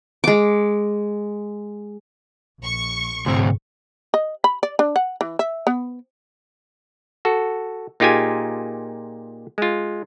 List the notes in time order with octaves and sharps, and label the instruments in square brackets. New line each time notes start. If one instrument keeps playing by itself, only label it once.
[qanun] G#3 D6
[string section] A#1 C#6
[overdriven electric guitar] D2 C4 [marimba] G#2 C3
[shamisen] D#5
B5
D5
D4
F#5
E3
E5
B3
[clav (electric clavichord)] F#4 A4
A#2 D#4 F4 G4 G#4 G#5
G#3 F4